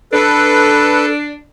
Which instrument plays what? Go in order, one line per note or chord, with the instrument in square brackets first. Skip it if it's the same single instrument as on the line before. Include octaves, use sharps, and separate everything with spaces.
[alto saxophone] D4 [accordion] A4 B4